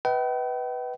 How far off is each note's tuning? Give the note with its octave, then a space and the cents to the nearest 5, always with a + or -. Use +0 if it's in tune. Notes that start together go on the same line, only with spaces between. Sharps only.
B4 +0 D#5 +45 G5 -40